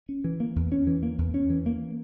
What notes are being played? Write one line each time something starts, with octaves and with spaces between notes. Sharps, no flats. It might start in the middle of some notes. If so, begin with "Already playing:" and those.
C#4
E3
A#3
E2
C#4
E3
A#3
E2
C#4
E3
A#3